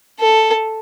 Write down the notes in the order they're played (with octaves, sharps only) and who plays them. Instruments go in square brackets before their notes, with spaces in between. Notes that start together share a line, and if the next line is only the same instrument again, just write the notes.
[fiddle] A4